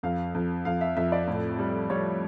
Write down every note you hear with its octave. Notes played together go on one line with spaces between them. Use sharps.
F2 F5
F2
F2 F5
E5
F2 E5
D5
A2
G3
G3 C#5